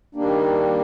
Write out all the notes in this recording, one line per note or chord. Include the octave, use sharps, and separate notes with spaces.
D#3 G3 A#3 D4